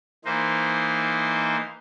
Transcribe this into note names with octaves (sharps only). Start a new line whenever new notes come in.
E3 A#3 D#4 C5